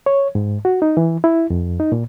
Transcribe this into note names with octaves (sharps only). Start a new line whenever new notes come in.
C#5
G#2
F#4
D#4
E3
E4
F2
D#4
A#2